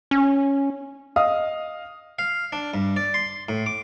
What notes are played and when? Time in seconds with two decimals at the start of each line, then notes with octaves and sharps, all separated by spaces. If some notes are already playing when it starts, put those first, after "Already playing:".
0.11 C#4
1.16 D#5 F5 D#6
2.19 F5
2.53 D4
2.74 G2
2.96 D5
3.14 C6
3.49 A2
3.66 D6